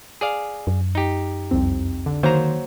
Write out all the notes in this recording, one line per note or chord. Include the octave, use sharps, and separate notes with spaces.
G#4 D5 F5
F#2
D#4 G4
C2 F2 C4
D3
D#3 F#3 A#3 C5 A#5